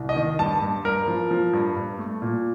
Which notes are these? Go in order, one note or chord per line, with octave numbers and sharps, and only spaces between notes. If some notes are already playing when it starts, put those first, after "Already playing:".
Already playing: C2
D#5
D#3
G2 A5
G2
G2 A#4
F3
F3
G2
G2
A3
A#2